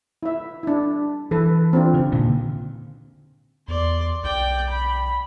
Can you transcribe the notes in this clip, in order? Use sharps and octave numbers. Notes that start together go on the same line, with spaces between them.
E4 E5
D4 E4
E3 A4 B4
C4 D4 F4
C#3
A#2 D3 D#3
E2 D5 C6
B1 D5 G5
B5